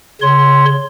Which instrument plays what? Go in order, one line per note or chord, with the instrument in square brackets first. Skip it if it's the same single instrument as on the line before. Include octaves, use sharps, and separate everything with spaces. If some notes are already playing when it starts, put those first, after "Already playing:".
[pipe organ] C#3 C#5 C6